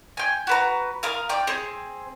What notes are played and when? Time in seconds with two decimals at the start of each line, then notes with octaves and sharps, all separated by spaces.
0.17 G5 G#5
0.47 F#4 B4 A#5
1.03 A#4 F5 D#6
1.29 D5 G5
1.47 C4 G#4